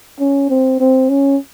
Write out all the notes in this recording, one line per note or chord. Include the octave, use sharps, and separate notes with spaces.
C#4
C4
C4
C#4